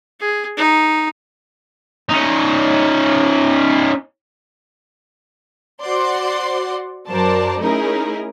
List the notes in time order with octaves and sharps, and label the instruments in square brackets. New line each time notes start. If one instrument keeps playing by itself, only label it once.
[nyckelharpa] G#4
D#4
[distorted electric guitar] C#4 D#4
[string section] F#4 C5 D5 F#5 C6
F#2 F#4 A#4 C5 D5 A5
A3 C#4 D#4 E4 G#4 A#4